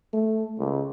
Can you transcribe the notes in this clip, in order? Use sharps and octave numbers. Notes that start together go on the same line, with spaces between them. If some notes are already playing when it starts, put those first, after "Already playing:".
A3
C#2